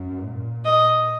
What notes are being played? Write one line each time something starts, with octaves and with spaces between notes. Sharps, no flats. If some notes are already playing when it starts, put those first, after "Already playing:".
Already playing: F#2
A#2
D#5